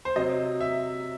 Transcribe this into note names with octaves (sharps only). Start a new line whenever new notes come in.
C5
C3 F#3 D#5
E5